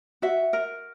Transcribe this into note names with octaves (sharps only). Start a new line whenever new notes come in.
F#4 E5
A#4